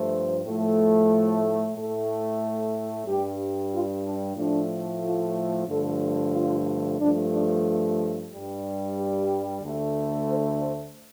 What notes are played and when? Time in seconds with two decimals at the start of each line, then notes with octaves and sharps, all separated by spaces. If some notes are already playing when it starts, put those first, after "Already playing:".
Already playing: G2 F3 A3 C5
0.43 A2 F3 A3
1.74 A2 A3 A4
3.06 G2 G3 G4
3.71 F4
4.04 D4
4.36 A2 F3 A3 D4
5.02 F4
5.67 G2 D3 F3 A3 A4
6.33 F4
6.99 G2 F3 A3 D4
7.32 D4
8.30 G2 G3
8.96 G4
9.61 D2 D3 A3
10.27 C5
10.59 C5